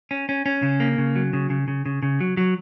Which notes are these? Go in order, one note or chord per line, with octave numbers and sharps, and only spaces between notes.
C#4
C#4
C#4
C#3
A#3
C#3
F#3
C#3
C#3
C#3
C#3
C#3
F#3
F#3